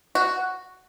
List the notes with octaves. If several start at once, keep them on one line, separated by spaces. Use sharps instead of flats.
F#4